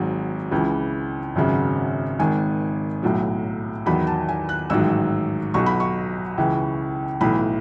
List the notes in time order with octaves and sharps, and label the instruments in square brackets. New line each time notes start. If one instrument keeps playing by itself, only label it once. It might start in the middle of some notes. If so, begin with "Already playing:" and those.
Already playing: [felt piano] G#1 G#2 F#3
C#2 C#3 E3
G#1 F#2 C#3 F#3
G#1 G#2 D#3 G#5
B1 A2 F#3
E2 D#3 F#3 B5
A5
G#5
F#6
A1 G#2 D#3 F#3 E6
B1 B2 F#3 C#6
B5
C#6
C#2 C#3 E3
B1 A2 E3 B5